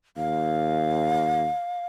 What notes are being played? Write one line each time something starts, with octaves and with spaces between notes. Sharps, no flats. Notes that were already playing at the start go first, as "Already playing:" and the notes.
D#2 F5